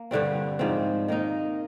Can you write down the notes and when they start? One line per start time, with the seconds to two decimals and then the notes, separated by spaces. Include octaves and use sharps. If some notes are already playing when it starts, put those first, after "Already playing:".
Already playing: A#3
0.11 G2 D3 G3 C4
0.59 G#2 F3 C4
1.08 D#3 A#3 D#4